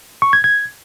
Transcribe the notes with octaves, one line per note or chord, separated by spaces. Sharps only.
C#6
G#6
G#6